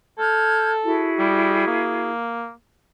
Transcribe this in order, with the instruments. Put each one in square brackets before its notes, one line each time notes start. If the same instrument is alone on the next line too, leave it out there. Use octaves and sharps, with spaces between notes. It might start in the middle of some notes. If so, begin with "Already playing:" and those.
[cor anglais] A4 [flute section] F6 G6 G#6
[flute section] E4 F#4 G#4
[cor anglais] G3
A#3